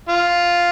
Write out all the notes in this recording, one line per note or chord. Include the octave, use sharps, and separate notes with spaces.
F4